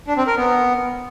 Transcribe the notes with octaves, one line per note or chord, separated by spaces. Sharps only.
D4
C4
A#4
B3